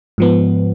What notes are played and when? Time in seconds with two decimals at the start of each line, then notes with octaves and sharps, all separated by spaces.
0.18 G#2 F3 B3